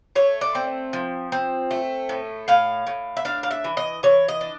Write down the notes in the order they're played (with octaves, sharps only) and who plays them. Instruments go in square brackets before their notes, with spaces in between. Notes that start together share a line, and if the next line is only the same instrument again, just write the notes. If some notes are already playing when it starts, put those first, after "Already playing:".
[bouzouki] A3 C#5
D5
C4
F3
C4
A3
A2
A2 F5
A2
E5
D4 F5
F5
E5
E3
D#5
E3 C#5
D#5
D4